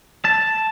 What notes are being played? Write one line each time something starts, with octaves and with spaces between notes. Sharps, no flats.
A5